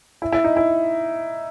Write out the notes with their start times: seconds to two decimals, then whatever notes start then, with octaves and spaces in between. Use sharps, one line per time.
0.22 E4
0.32 E4
0.44 D#4
0.57 E4